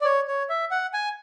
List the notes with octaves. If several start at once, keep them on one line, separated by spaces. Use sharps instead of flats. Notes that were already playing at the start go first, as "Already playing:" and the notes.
D5
C#5
C#5
E5
F#5
G#5